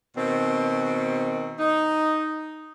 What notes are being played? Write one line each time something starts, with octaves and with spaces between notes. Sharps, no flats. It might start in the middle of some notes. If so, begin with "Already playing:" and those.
B2 D#3 C4
D#4